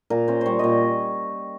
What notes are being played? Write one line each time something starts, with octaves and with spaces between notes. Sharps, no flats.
A#2 A#4
C#4 C5
G3 C5 C#5
A#2 D#5